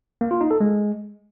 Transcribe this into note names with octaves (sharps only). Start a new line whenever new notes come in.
A#3
F4
D#4
A4
G#3